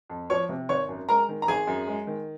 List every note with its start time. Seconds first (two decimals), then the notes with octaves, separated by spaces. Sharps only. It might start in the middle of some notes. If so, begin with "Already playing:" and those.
0.10 F2
0.30 F3 C#5 C#6
0.49 C3
0.69 G#1 C#5 C#6
0.89 F#2
1.09 G#3 A#4 A#5
1.29 D#3
1.42 A#5
1.48 G#1 G#4 G#5
1.67 F#2
1.87 G#3
2.07 D#3